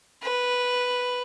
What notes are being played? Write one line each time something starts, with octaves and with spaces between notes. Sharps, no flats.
B4